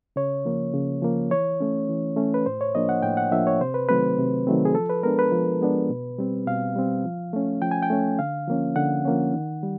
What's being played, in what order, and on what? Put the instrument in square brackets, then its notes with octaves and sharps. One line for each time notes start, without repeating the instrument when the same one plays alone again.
[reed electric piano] C#3 C#5
F3 A#3
C#3
F3 A#3
E3 C#5
A3 C#4
E3
A3 C#4
B4
A2 C5
C#5
F3 A#3 D4 D#5
F#5
A2 G5
F#5
F3 A#3 D4 E5
C#5
C3 C5
B4
D#3 F#3 A3 C4 B4
C3
D#3 F#3 A3 C4
G#4
F3 A4
B4
G#3 B3 D4 A#4
B4
F3
G#3 B3 D4
B2
G3 C4
B2 F5
G3 C4
F3
A3 C#4
F3 G5
G#5
G5
A3 C#4
D3 F5
F3 A#3 C#4
D3 F#5
F3 A#3 C#4
D#3
G3